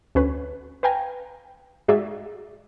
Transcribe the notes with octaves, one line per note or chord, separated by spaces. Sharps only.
D2 C#4 B4
B4 F5 G5 G#5 A#5
G#2 F#4 G#4 D5 E5